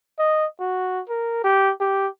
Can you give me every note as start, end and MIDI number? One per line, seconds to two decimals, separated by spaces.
0.19 0.46 75
0.60 1.01 66
1.09 1.42 70
1.44 1.73 67
1.80 2.08 67